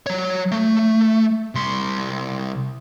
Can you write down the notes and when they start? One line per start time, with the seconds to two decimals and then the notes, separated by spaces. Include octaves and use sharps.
0.06 F#3 C#5
0.52 A3
1.55 C2 C6